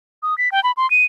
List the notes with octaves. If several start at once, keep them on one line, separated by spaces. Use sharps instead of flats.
D#6
B6
G5
B5
C6
D#7